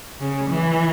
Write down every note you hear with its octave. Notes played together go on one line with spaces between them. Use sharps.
C#3
E3